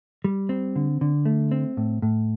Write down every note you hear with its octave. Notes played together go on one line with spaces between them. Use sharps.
G3
C4
D3
D3
A3
C4
A2
A2